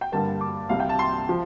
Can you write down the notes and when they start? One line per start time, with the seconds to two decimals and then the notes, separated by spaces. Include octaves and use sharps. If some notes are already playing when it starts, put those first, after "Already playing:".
0.01 G5
0.12 G2 D3 G3 A#3 A5
0.41 D6
0.69 C2 C3 G3 F5
0.80 G5
0.89 A5
0.99 C6
1.29 F3